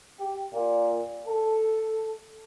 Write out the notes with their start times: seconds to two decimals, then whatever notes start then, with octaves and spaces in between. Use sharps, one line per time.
0.20 G4
0.53 A#2
1.26 A4